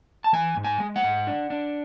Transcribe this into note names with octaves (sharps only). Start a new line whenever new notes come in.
A5
E3 G#5
G#2
G#5
G#3
F#5
G#2
D4
D4